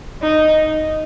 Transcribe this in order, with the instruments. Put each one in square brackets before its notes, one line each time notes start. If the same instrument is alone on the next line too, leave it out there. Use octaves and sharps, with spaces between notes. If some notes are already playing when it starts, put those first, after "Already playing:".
[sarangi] D#4